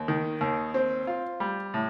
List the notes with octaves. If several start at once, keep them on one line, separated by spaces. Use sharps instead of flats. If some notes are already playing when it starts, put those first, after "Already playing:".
Already playing: D#2
D#3
D#2
C4
F4
G3
A2